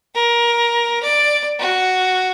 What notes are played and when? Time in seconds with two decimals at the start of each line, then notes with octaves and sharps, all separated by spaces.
0.15 A#4
1.03 D5
1.59 F#4